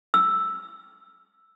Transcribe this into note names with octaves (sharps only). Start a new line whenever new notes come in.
E6